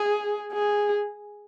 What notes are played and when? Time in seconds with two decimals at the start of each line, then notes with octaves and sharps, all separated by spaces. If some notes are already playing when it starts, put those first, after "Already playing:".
Already playing: G#4
0.52 G#4